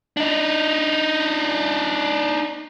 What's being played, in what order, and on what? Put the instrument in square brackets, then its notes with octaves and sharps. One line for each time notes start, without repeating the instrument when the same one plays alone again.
[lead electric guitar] D4 D#4